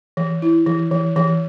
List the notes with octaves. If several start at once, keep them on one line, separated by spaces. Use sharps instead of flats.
E3
E4
E3
E3
E3